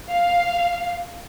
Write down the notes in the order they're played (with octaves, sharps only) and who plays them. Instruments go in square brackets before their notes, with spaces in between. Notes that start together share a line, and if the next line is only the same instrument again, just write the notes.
[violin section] F5